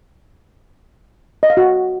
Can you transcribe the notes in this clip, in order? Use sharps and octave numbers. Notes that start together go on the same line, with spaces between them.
D#5
F5
F#4